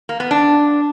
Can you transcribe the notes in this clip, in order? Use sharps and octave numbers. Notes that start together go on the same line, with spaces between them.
A#3
B3
D4